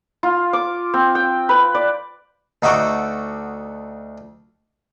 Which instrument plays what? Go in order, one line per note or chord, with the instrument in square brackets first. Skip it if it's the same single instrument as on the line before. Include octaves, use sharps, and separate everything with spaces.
[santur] F4
D6
C4
G5
B4
D5
[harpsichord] D2 D#4 F#4 A4 D6